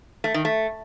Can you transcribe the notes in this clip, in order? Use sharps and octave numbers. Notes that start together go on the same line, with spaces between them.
A3
D#3
A3